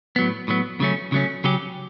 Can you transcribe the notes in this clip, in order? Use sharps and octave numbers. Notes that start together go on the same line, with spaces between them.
A2 F#3 B3
A2 F#3 B3
C#3 F#3 A3 C#4
C#3 F#3 A3 C#4
C#3 F#3 C#4 G4